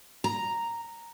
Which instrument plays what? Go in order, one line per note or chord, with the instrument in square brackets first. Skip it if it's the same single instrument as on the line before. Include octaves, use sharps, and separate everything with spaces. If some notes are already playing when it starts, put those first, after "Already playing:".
[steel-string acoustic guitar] A#5